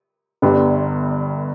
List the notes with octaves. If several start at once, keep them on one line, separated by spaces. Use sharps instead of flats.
G1 G2 D3 G3 B3